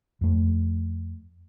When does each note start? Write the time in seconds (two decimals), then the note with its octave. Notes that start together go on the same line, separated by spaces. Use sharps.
0.21 F2 A3